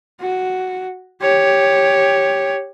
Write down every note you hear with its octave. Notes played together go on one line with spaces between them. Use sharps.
F#4
G4 C#5